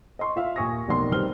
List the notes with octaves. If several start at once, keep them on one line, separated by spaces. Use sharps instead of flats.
D#5 C6 C#6
F4 E5 F5
D#2 A#2 G#5 C#6 D#6 A#6
F1 B1 B2 D#3 D5 C6
D#3 G3 C4 B4 F6 G7